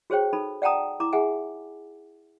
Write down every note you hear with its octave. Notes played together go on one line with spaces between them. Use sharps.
F#4 G#4 C5 C#5 G5
D#4 A4 A5 B5
D5 F#5 G5 A5 A#5 D#6
E4 A#5 D6
G#4 E5 F#5 G#5